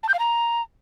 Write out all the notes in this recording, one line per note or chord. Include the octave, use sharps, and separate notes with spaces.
A5
G6
F5
A#5